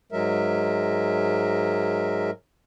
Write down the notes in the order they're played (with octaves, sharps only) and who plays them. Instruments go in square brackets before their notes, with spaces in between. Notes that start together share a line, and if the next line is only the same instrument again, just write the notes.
[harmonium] G#2 F#3 G#3 A#4 E5